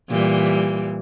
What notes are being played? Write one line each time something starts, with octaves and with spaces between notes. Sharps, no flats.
A#2 E3 G3